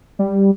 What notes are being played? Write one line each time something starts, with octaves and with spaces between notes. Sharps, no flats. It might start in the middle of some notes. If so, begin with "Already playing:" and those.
G3